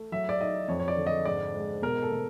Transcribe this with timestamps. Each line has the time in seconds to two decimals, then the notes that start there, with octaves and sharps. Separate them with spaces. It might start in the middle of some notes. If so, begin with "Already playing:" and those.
Already playing: A3
0.12 F#3 E5
0.29 D5
0.40 D#4 D#5
0.68 F2 C#5
0.80 C#5
0.88 D5
0.97 D3
1.07 D#5
1.25 G#2 D5
1.55 G#3
1.82 B2 A#4
2.03 A4
2.12 B2